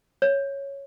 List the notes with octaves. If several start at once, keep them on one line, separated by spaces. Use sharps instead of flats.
C#5